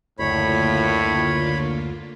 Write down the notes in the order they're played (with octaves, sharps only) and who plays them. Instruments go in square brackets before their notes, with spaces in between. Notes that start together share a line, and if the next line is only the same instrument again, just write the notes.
[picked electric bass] F#1 D2 [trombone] A2 [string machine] D3 A#3 F4 [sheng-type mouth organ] C#5 B5